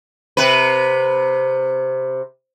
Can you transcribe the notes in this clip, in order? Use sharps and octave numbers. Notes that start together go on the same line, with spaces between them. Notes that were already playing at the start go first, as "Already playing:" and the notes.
C3 B4